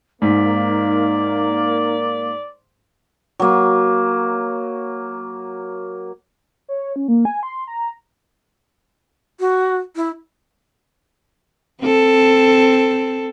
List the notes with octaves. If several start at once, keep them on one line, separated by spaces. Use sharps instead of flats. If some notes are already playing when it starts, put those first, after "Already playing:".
G#2 A#3 D#4 D5
F#3 A#3
C#5
C#4
A#3
G#5
C6
A#5
F#4
E4
C4 A4